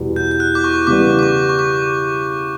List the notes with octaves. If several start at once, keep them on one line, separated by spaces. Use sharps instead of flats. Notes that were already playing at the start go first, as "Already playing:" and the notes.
Already playing: E2 B2 G3
G6
G6
F#6
D6
C#6
C#3 E3 G3 B3 D6
D6
C#6
C#6
D6